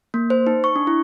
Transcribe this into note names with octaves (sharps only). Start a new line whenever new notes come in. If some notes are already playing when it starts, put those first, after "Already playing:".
A#3
C5
D#4
C#6
D4
E4